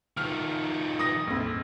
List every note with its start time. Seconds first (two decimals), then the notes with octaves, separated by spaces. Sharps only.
0.17 D#3 F3 F6
0.99 D#6 A#6
1.27 A#1 F2